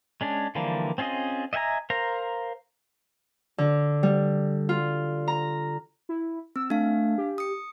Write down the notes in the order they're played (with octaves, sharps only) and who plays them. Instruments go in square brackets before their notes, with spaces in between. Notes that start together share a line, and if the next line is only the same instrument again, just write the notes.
[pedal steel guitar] G#3 C#4 D4
D3 E3 F3 G3 A#3
C4 C#4 F4 G#4 D#5
D#5 E5 F#5 G#5 A#5
A#4 C5 F5 A#5
[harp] D3
G3
F4
A#5
[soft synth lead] E4
[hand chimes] C4 [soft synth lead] E6
[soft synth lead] A3 [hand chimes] D4 F5
[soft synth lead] G4
[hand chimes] D#6 C#7